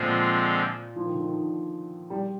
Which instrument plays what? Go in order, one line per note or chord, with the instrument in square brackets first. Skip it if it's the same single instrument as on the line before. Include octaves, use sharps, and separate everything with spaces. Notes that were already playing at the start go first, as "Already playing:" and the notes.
Already playing: [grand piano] A#2 [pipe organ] D3 F3 G#3 C4 F4
[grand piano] F3
D#3
D3
D#3
G3